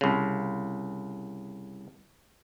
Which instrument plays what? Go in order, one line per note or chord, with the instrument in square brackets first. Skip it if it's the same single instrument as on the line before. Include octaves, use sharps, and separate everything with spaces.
[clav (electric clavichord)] C2 C#3